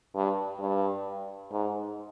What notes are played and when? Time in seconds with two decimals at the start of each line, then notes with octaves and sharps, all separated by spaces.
0.15 G2
0.60 G2
1.51 G#2